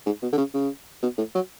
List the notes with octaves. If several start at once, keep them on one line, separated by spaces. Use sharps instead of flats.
G#2
B2
D3
C#3
C#3
B2
A2
F#3